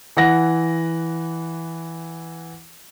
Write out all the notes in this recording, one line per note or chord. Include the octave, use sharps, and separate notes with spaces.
E3 F#5 A#6